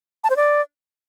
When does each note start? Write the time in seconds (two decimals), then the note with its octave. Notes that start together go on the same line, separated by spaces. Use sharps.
0.24 A5
0.30 C5
0.36 D5